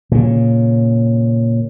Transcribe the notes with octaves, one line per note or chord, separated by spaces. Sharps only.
A#2 C#3